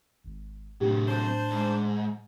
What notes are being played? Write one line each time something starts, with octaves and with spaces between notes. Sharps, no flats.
G#1
A2 C3 F#3 C4 D4 G4
D4 C5 A5
G#2